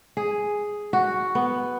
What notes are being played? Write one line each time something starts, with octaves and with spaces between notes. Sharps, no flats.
G#4
F#4
B3